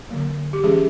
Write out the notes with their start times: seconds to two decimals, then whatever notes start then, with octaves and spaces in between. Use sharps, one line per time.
0.10 D3 F#3 A#3
0.53 G4
0.63 E3 G#3 C#4 G#4